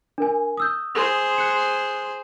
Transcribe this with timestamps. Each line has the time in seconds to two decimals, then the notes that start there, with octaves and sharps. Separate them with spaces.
0.18 D4 A#4 G#5
0.57 D#6 E6 G6
0.95 G#4 C5
1.38 F#6 C#7